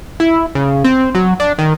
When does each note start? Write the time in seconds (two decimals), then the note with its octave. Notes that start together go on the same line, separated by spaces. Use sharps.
0.20 E4
0.55 C#3
0.84 C4
1.15 F#3
1.40 D4
1.58 D#3